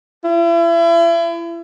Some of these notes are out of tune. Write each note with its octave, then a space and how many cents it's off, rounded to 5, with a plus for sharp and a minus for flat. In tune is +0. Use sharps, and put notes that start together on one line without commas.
E4 +35